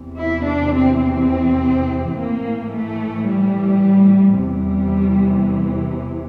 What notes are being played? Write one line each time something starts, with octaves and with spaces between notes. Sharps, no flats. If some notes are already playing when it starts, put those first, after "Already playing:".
Already playing: E2 C3 E3
E4
D4
C4
C4
A2 E3 A#3
A3
G3
E2 C3 E3 G3